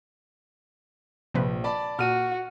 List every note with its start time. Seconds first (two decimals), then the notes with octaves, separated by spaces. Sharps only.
1.34 A#1 C3 F3 B4
1.64 D5 A5 B5
1.99 A#2 F#4 F6 D#7